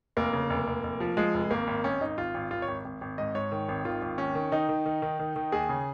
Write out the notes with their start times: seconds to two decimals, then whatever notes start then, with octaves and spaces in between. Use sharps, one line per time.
0.17 F1 A#3
0.33 C#3
0.50 F1
0.67 F1
0.83 F1
1.00 F3
1.17 F3 G#3
1.34 F1
1.50 G#1 A#3
1.67 G#1
1.84 G#1 C#4
2.00 G#1 D#4
2.17 G#1 F4
2.34 G#1
2.51 G#1 F4
2.62 C#5
2.68 G#1
2.85 G#1
3.01 G#1
3.18 G#2 D#5
3.35 G#2 C#5
3.52 D#3
3.68 G#1
3.85 D#3 F4
4.02 G#1
4.18 D#2 C#4
4.35 D#3
4.52 D#3 D#4
4.69 D#3
4.86 D#3
5.02 D#3
5.19 D#3
5.36 D#3
5.52 D#2 G#4
5.69 C#3